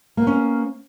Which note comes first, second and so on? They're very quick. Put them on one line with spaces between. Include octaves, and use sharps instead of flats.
A#3 B3 C#4